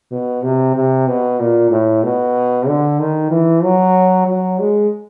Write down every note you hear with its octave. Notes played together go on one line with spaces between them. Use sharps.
B2
C3
C3
B2
A#2
A2
B2
D3
D#3
E3
F#3
F#3
G#3